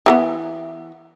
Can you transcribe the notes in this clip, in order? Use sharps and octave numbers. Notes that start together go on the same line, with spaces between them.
E3 G3 B3